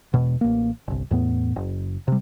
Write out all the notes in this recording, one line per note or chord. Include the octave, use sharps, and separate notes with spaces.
E1 B2
A1 A#3
G1 C2
E2 A2 B3
F#1
C3 G3